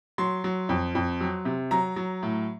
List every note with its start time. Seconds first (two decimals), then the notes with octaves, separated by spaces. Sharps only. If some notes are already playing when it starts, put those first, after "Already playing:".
0.18 F#3 C6
0.44 F#3
0.69 F2
0.95 F2
1.21 F#3
1.45 C3
1.71 F#3 A#5
1.96 F#3
2.23 A2